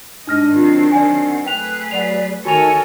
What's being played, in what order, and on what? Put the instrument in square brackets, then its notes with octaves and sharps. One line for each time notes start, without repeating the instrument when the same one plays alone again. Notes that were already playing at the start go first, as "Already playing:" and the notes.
[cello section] G#2 D#5 [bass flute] D4 [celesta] D#4 F6 A#6
[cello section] D#3 F#3 C4 [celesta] F4
[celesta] D5 G#5 [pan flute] F#5
[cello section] A3 G#4 B4 [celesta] G5 F7 [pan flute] F#6
[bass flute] F#3 [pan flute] D5 [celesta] F#5 F7
[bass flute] D#3 [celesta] F#4 F7 [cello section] A4 A#4 C#5 [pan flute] G#5